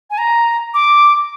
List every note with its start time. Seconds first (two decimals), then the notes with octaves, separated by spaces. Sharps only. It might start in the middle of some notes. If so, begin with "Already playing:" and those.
0.10 G#5
0.18 A#5
0.74 D6